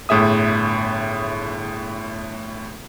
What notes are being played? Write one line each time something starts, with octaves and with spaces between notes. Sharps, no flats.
G1 A2 G#4 E5 D#6